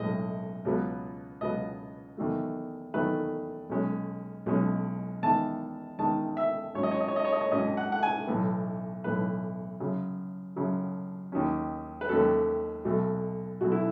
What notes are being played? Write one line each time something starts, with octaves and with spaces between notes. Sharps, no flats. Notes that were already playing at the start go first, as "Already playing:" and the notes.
Already playing: B1 A2 G#3 D#5
C#2 B2 F#3 B3
C#2 B2 F#3 B3 D#5
E2 D#3 F#3 A3
E2 D#3 F#3 A3 B4
B1 B2 G#3 C#4
B1 B2 G#3 C#4
E2 D#3 G#3 A5
E2 D#3 G#3 A5
E5
G#1 G#2 F#3 C#4 C#5
D#5
C#5
D#5
C#5
D#5
C#5
D#5
C#5
G#1 G#2 F#3 C#4 D#5
F#5
F#5
G#5
B1 A2 E3 B3
B1 A2 E3 B3 B4
F#2 C#3 F#3
F#2 C#3 F#3
D#2 D#3 F#3 C#4
B4
D#2 D#3 F#3 C#4 A4
B1 B2 F#3 A3
B1 B2 F#3 A3 F#4
E4